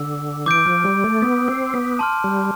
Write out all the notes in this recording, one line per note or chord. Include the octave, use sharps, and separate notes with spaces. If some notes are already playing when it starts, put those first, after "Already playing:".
Already playing: D3 E6
E3 D6 G6 D7
F3
G3
A3
B3
C4
B3
A5 C6 F6
G3